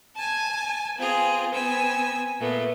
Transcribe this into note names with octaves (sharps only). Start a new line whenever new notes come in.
G#5 A5
B3 C4 F4 G#4
B3 C4 G#5 E6
A#2 A3 B3